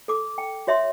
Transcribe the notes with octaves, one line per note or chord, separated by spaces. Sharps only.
A4 D6
G5
F#4 C#5 E5 C6